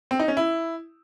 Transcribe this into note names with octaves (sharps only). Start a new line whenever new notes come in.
C4
D#4
C#4
E4